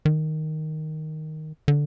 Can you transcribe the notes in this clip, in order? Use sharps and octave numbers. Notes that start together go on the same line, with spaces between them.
D#3
D3